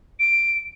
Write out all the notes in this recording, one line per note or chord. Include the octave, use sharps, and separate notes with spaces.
D7